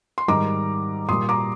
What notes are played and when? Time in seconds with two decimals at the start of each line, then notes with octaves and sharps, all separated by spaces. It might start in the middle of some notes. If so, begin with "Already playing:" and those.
0.18 C6
0.28 G#2 D#3 G3 A#5 D6
1.09 A#2 G3 C6 D#6
1.29 A#5 D6